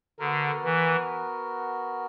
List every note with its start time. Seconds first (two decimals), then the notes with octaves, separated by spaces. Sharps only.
0.19 D3 B3 F#4 A#4
0.65 E3